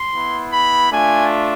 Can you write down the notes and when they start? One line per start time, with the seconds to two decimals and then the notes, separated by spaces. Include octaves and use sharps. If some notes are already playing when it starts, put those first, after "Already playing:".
Already playing: C6
0.12 B3 E4
0.50 B5
0.90 A3 D4 F4 G#5